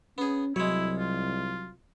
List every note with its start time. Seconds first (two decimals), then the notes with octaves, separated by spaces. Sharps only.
0.18 B3 C#4 G#4
0.56 C2 F#3 G#3 E4 C#5
0.99 F4